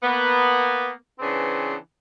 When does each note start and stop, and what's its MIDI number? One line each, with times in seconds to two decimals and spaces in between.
0.03 0.90 58
0.03 0.90 59
1.19 1.74 49
1.19 1.74 52
1.19 1.74 59
1.19 1.74 60
1.19 1.74 62
1.19 1.74 68